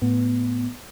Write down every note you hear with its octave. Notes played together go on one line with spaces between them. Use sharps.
A2 B3